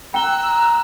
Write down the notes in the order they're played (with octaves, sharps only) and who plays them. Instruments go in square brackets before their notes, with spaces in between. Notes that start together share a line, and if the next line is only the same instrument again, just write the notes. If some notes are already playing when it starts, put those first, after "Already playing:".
[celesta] G5 G7 [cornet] A#5 [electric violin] E6 F#6